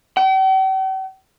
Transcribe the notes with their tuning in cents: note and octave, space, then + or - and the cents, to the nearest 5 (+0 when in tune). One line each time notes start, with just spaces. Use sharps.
G5 -45